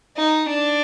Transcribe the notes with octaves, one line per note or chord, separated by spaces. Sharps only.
D#4
D4